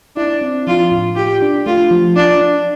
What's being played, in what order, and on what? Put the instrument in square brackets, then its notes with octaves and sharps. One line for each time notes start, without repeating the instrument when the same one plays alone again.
[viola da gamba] D4 [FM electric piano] E4
[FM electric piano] C4
[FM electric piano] F3 [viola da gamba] F4
[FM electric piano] A2
[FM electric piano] F4 [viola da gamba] G4
[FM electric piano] D4
[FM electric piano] A3 [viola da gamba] F4
[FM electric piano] F3
[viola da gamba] D4 [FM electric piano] F4
[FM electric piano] D4